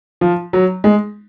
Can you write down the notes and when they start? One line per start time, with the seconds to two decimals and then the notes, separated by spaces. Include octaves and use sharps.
0.21 F3
0.53 F#3
0.84 G#3